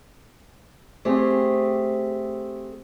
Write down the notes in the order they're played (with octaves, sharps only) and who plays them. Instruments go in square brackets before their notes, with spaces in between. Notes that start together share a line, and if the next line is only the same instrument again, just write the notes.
[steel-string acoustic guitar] A3 C4 G4 G#4